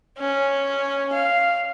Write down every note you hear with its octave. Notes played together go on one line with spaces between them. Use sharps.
C#4
F5